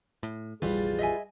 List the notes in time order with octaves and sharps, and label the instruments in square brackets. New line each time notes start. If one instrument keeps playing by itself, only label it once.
[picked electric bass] A2
[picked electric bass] F1 A#1 E3 [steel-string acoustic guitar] G3 F4 B4 [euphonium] G#4
[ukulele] D#5 E5 G#5